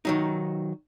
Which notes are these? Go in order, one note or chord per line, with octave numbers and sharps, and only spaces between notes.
D#3 F#3 D#4